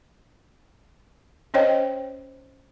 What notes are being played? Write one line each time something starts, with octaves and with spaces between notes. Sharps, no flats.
C#4 C5 C#5 D#5 G5